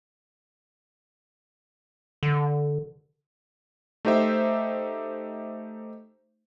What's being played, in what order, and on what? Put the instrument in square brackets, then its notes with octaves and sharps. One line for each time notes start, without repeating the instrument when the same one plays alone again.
[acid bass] D3
[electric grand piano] A3 D#4 G4 C5 E5